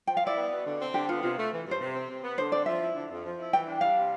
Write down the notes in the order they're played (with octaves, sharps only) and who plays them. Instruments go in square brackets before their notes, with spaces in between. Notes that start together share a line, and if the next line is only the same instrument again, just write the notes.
[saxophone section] F3 [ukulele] G5
[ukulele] F5
[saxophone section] E4 [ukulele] D5
[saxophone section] B3
B2
D3
C4
[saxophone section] D3 [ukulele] G4
[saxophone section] B3 [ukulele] F4
[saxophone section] C3 [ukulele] F4
[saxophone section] A3
E3
G2
[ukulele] C5
[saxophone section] C3
C4
C3
B3
[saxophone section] D3 [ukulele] C5
[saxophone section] C4 [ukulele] D5
[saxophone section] F3 [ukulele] E5
[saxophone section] E4
D3
F2
F3
E4
[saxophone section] E3 [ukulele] G5
[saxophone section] D4
[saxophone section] G3 [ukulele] F5
[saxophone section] C3